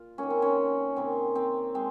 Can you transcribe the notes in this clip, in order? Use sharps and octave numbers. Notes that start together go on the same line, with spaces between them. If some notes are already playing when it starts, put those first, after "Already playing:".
Already playing: A#2 F4
D#3 A#3 C#4
C4
C#4
C3 D#3 A#3 C4
C4
G#3 C4